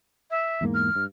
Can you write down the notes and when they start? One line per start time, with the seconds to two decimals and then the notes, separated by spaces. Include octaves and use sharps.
0.31 E5
0.61 E2 G#2 A#3
0.74 F6
0.95 G2